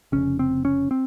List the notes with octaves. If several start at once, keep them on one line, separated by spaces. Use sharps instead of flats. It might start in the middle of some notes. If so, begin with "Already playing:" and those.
F1 D#2 C#3 C#4
C4
C#4
C4